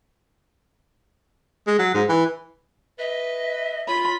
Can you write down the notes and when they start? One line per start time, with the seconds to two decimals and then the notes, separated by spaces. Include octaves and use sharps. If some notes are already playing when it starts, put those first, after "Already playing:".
1.67 G#3
1.79 F#3
1.94 G#2
2.09 E3
2.99 B4 D#5 E5
3.88 F4 C#5 B5